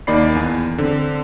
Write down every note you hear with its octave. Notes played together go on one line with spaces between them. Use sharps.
D#2 A#3 D#4 D5 B5 C7
E2 G#5
D3 C4